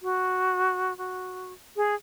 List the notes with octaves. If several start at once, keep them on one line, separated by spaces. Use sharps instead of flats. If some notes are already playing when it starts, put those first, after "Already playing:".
F#4
F#4
G#4